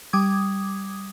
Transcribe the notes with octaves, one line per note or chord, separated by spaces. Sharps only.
G3 D6 D#6 G#6